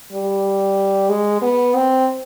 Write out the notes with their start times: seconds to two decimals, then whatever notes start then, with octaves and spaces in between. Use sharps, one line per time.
0.12 G3
1.09 G#3
1.41 B3
1.75 C4